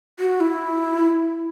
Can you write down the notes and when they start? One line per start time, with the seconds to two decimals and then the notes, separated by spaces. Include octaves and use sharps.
0.20 F#4
0.40 E4